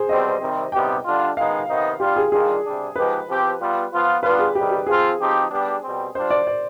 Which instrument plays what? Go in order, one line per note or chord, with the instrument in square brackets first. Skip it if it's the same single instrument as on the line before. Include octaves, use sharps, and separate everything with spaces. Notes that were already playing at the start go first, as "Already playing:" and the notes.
Already playing: [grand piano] G#4 C5
[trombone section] B2 G3 C4 [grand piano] D#5
[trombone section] C3 D#3 G3 C4
[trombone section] C3 G3 B3 D#4 G4 [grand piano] G5
[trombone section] D3 G3 D4 F4
[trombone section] D#3 G#3 B3 D#4 [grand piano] F5
[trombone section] C3 D#3 B3 D#4
[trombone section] G3 D4 F4 [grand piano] G4
[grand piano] G#4
[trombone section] D#3 G3 D4 F4 [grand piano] G#4
[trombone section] C3 G3 D4
[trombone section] F3 G#3 B3 D#4 G4 [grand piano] B4
[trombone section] F3 C4 G4
G3 B3 F4
F3 B3 F4
[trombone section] G3 B3 D4 F4 [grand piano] B4
[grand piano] G#4
[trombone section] C3 D#3 G3 [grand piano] G4
[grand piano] G4
[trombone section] F3 C4 F4 [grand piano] G#4
[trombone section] F3 C4 D#4 G4
G3 B3 D4 G4
B2 G3 C4
[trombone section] G3 D4 F4 [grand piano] C5
[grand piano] D5
D5